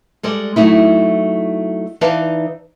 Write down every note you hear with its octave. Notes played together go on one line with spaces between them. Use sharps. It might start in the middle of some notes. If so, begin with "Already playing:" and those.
G3 G#3 A4 D5
F#3 A3 D#4 E4
E3 D#4 B4 D5 F5 A5